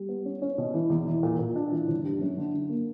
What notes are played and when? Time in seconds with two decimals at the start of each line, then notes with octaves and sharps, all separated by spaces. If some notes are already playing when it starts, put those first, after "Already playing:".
Already playing: G3
0.09 B3
0.25 C#4
0.42 C#4
0.58 B2
0.74 E3
0.90 E2
1.06 E3
1.23 A#2
1.39 A#2
1.56 D4
1.72 E3
1.88 G1
2.05 G2
2.21 F#2
2.37 D3
2.54 D3
2.70 A#3